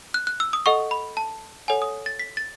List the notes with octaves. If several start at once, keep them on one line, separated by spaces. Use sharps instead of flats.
F#6
F#6
E6
D#6
A4 D#5 F#5 C#6
B5
A5
A4 C#5 F#5 G#5
D#6
A6
B6
A6